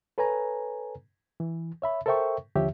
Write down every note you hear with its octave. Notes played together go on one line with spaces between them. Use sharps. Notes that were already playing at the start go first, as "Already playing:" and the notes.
A4 B4 C#5 G#5 A#5
E3
C#5 E5 B5
A4 A#4 C5 E5 G5 C#6
D#2 D3 F3 G4 C#5 E5